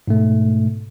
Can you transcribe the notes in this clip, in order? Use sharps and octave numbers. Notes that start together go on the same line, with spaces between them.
G#2 B2 A3